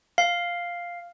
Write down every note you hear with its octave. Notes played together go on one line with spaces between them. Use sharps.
F5